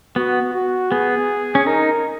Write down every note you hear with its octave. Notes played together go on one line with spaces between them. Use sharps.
B3 F#4
F#4
B3 G#4
C#4
D#4 A#4